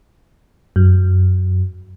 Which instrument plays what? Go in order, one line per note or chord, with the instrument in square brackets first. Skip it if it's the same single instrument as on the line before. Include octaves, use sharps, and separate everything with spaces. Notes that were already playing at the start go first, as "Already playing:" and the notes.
[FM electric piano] F#2